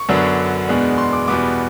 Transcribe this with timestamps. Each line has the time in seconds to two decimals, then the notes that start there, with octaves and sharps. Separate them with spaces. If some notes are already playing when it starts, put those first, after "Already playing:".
Already playing: C#6
0.09 F#2 D3 F#3 B3 D4
0.68 E2 B2 G#3 B3 D4
0.98 C6
1.13 D6
1.28 E2 B2 G3 B3 D6